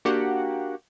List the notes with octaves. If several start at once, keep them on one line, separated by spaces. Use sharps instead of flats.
A#3 D4 F#4 G4 F#5